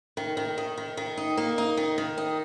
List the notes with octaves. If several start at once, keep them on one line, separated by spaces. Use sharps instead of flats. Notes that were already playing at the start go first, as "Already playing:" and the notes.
D#3
D#3
D#3
D#3
D#3
D#4
A#3
D#4
D#3
D#3
D#4